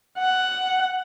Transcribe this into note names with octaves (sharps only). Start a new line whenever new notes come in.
F#5